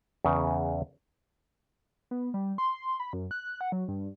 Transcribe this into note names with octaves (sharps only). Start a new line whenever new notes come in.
E2 C#3
B3
G3
C6
B5
F#2
F#6
F#5
F#3
G2